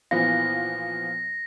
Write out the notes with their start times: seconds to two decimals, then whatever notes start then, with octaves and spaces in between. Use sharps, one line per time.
0.11 A#2 E3 F3 B3 F4 A#6